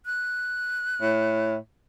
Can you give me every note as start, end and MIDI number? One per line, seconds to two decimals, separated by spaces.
0.06 1.54 90
1.01 1.56 45